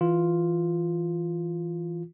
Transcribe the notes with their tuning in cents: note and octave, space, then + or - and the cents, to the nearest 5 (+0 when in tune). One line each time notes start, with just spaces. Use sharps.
E3 +0 F4 +0